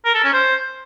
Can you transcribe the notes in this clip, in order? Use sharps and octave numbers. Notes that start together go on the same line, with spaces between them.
A#4
A4
C#4
C5